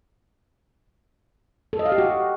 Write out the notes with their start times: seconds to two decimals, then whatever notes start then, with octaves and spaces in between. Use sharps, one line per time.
1.73 A4
1.79 D#5
1.86 F5
1.92 G4
1.98 F#4